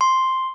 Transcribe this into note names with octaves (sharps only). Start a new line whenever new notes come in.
C6